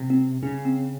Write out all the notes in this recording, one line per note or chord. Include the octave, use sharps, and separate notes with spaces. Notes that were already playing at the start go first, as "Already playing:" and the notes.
Already playing: C3
C4
C#3 C#4
C4